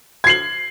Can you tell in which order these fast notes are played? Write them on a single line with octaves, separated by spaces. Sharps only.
G#6 C7 F#7